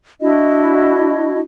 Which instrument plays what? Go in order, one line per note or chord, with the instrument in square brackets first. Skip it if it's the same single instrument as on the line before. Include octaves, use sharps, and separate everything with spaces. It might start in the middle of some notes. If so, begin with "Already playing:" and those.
[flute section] D4 E4 F#4 D#5